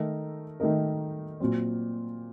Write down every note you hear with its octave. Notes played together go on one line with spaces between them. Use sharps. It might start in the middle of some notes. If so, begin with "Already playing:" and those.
Already playing: D#3 A3 D#4 A#4
D#3 A3 D#4 A#4
A#2 F#3 C4